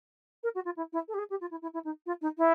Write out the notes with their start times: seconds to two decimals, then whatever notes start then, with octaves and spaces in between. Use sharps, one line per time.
0.43 A#4
0.55 F#4
0.65 F4
0.76 E4
0.92 E4
1.08 A4
1.14 G4
1.18 G#4
1.30 G4
1.41 F4
1.51 E4
1.62 E4
1.73 E4
1.84 D#4
2.06 F4
2.21 D#4
2.38 E4